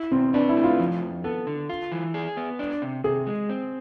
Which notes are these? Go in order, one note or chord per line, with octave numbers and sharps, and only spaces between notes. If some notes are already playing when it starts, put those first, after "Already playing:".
Already playing: E4
B2 C4
D4 B4
E4
A3
F4
F3
F2
B3 A4
D3
F4
E3
G#4
B3
D4
C3
C3 G#4
G#3
C4